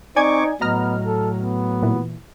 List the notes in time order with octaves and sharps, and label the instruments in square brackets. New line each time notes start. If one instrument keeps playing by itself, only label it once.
[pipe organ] C4 C#6 D6 [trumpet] D#4 [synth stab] D5 G#5 G#6
[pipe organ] A2 F#3 [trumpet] B3 [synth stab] D#5 A#5 F6
[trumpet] A4
B3
[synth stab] A#2 E3